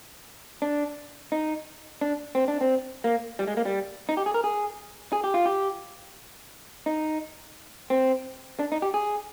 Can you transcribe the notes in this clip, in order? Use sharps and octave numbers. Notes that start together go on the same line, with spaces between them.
D4
D#4
D4
C4
D4
C4
A#3
G3
G#3
A#3
G3
D#4
G4
G#4
A#4
G#4
G#4
G4
F4
G4
D#4
C4
D4
D#4
G4
G#4